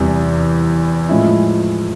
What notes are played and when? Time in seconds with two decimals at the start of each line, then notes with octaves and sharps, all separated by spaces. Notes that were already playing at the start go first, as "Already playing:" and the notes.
Already playing: E2 C3 E3 G3
1.09 A2 F3 G#3 C#4 E4